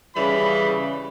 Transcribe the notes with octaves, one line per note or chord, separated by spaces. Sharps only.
C#3 E3 G3 B5